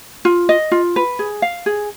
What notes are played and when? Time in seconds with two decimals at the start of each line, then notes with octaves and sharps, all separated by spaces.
0.25 F4
0.49 D#5
0.72 F4
0.96 B4
1.19 G#4
1.42 F5
1.66 G#4